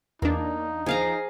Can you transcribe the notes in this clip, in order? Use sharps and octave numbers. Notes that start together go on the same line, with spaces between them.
E2 A#3 D4 D#4
F3 G#4 F5 A#5